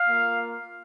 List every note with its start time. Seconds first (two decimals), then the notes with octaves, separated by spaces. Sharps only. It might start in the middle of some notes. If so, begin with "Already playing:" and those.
Already playing: F5
0.08 A#3 F4